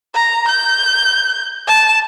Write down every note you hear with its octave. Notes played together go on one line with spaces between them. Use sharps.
A#5
G6
A5